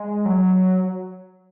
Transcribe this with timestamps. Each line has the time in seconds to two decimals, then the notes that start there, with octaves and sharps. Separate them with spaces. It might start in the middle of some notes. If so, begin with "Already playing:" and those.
Already playing: G#3
0.25 F#3